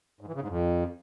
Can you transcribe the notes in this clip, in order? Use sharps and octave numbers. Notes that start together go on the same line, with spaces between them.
G#2
E3
C#3
G#2
F2